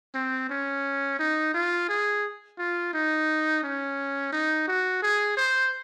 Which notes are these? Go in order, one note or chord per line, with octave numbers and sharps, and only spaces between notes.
C4
C#4
D#4
F4
G#4
F4
D#4
C#4
D#4
F#4
G#4
C5